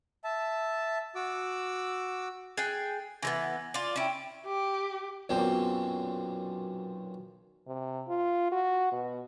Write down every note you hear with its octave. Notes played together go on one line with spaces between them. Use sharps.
E5 A5
F#4 D6 E6
G#4 G5 F#6 A6
E3 G3 B3 G#5 G#6 A#6
F4 D5
C#4 E4 G5 D7 E7
G4
B1 F#2 A#2 C4
C3
F4
F#4
B2